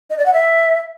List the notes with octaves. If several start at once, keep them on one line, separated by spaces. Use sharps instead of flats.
D#5
D5
F#5
E5